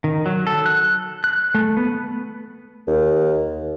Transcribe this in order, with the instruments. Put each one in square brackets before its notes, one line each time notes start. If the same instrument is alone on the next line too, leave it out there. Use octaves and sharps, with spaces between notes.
[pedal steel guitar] D#3
F#3
A4
F#6
F#6
A3
B3
[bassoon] D#2